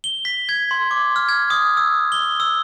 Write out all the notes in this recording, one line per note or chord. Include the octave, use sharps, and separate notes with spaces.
G7
B6
G#6
C6
D6
F6
G#6
D#6
E6
G7
E6